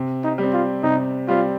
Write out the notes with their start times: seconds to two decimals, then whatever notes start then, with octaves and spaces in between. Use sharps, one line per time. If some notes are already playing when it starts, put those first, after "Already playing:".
Already playing: C3
0.24 D#4
0.38 G3 C4
0.53 F4
0.83 C3 D#4
1.28 G3 C4 F4